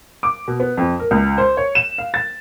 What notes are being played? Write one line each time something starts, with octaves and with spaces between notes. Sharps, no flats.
D6
B2
B3
F2
A#4
C#2
C5
C#5
E7
F5
A6